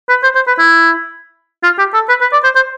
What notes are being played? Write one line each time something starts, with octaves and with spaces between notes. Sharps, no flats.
B4
C5
C5
B4
E4
F4
G4
A4
B4
B4
D5
C5
C5